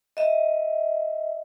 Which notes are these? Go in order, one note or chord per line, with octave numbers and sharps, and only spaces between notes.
D#5 E5